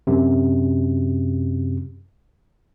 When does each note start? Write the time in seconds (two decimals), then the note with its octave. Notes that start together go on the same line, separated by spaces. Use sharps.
0.07 F#2 C3